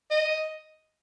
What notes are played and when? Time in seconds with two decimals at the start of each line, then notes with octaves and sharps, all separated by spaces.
0.11 D#5